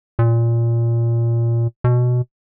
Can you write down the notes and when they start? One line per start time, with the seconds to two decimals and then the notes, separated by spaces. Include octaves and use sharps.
0.19 A#2
1.84 B2